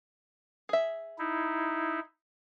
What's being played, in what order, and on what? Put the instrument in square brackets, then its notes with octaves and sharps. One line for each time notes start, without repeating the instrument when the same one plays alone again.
[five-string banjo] G#4 E5
[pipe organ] D#4 E4